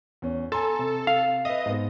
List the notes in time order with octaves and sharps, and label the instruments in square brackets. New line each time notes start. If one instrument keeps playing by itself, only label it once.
[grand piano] E2 C#4
[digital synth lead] A4 [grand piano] G#5 A#5 C6
[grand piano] C3
[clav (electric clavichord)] F5
[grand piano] B4 E5 [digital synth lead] D#5
[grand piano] G#2 B3